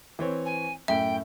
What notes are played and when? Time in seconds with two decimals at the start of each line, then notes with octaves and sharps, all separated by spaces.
0.19 E3 C4 C#5
0.45 G#5
0.88 F#2 A2 E5 G5